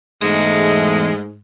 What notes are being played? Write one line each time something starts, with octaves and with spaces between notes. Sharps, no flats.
E2 G#2 G#3 A3 D#5